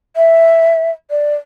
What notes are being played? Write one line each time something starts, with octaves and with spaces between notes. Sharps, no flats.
E5
D5